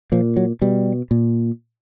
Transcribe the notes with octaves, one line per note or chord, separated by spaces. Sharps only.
A#2 F3
F#3
B2 G3
A#2